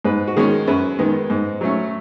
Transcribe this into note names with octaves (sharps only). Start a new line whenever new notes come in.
G#2 B4
F#4
D#3 G#3 C#4 G#4
F#2 B4
D#3 G#3 B3
G#2
F#3 A3 C#4